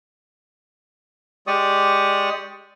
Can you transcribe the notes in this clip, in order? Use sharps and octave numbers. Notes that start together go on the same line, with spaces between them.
G#3 G4 D5 C#6 D#6